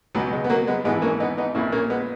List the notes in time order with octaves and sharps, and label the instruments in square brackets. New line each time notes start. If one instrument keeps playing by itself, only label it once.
[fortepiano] C#2 B2 F#3
G#3
B3
F#3 A#3
G#3 B3
G#1 G#2 E3 G#3 B3
A#3 C#4
B3 D#4
B3 D#4
A#1 A#2 C#4 E4
A#3 C#4
G#3 B3